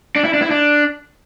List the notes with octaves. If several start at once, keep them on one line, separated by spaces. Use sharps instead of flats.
D4
E4
D4
E4
D4